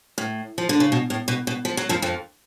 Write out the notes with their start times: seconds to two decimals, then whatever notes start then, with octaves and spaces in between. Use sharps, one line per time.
0.18 A2
0.58 F3
0.69 D3
0.80 C#3
0.92 B2
1.10 A2
1.28 B2
1.47 B2
1.65 F3
1.77 F#3
1.89 F2 F3
2.02 F2 F3